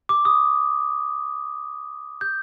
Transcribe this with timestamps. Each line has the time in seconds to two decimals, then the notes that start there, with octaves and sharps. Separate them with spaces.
0.09 D6
0.25 D#6
2.21 G6